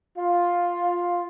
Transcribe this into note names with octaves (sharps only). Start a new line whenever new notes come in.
F4